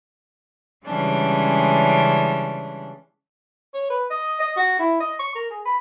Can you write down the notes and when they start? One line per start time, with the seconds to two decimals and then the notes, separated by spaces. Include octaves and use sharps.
0.85 C#3 E3 G3 G#3 C#4 D4
3.74 C#5
3.90 B4
4.10 D#5
4.40 D#5
4.57 F#4
4.79 E4
5.00 D#5
5.20 C#6
5.35 A#4
5.51 G#4
5.66 B5